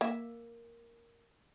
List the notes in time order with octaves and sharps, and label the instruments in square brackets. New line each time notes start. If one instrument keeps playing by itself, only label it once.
[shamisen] A#3 E5